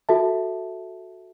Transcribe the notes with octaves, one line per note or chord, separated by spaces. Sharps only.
F#4 A4 E5 A5